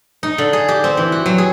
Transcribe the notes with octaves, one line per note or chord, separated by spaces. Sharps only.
D#4
D3
G#4
G4
C4
E3
F#4
F#3
G#4